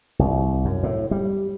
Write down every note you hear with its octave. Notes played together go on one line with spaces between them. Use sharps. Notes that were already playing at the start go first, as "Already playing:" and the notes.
C2
F#2
A2
G3